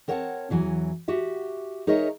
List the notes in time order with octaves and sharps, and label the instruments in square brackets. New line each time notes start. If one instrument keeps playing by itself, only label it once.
[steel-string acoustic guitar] C4 A#4 C#5 F#5 G5 A5
E2 E3 F#3 G#5
F#4 G4 E5
D#4 G#4 A#4 C#5 D#5 E5